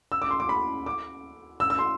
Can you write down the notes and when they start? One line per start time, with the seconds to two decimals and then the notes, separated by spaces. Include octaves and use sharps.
0.12 E6
0.22 D6
0.31 C6
0.40 D6
0.49 B5
0.86 D6
1.60 E6
1.70 E6
1.79 C6